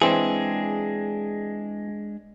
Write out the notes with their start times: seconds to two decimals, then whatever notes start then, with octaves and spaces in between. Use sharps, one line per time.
0.02 E3 G#3 C4 D4 G#4